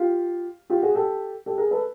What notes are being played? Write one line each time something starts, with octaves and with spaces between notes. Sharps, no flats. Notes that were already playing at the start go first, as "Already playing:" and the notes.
Already playing: F4 G4
F4 G4
F#4 G#4
G4 A4
G4 A4
G#4 A#4
A4 B4